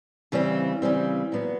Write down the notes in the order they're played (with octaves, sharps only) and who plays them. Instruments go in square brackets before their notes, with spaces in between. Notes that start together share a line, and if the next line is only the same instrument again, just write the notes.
[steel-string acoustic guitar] C#3 E3 G3 C4
C#3 E3 G3 C4
A#2 F#3 B3